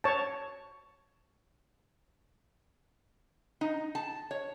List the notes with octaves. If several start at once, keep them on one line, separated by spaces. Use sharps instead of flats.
C#5 A5
D#4
A5
C#5